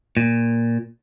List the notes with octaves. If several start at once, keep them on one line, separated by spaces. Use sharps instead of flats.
A#2